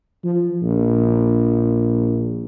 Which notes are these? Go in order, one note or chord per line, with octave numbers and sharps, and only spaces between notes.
F3
A#1